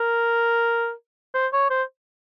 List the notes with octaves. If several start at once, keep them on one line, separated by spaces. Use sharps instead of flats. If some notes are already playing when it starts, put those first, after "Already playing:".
Already playing: A#4
C5
C#5
C5